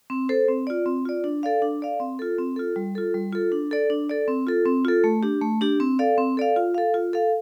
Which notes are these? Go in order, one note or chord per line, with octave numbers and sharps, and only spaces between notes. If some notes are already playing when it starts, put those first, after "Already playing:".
C4
A4 C5
C4
F4 D5
C4
F4 D5
D4
A4 D5 F5
D4
A4 D5 F5
C4
F4 A4
C4
F4 A4
G3
F4 A4
G3
F4 A4
D4
A4 D5
D4
A4 D5
C4
F4 A4
C4
F4 A4
A3
D4 G4
A3
D4 G4
C4
A4 D5 F5
C4
A4 D5 F5
F4
A4 F5
F4
A4 F5